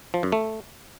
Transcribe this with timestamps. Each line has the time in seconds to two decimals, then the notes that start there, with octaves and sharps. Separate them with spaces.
0.14 F3
0.23 F#2
0.32 A3